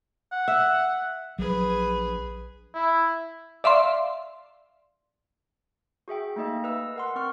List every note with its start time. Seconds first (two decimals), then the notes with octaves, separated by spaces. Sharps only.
0.32 F#5
0.48 E5
1.39 A#1 F#3 G#4 B4
2.74 E4
3.64 D5 E5 F5 C6
6.08 F#4 G#4 E5 G5
6.36 A3 A#3 D#4 D#5 E5
6.64 B4 D#5 E6
6.96 A#4 F#5 C6
7.16 C4 C#6 F6